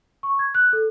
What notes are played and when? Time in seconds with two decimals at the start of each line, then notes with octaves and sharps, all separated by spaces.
0.23 C#6
0.39 G#6
0.55 F#6
0.73 A4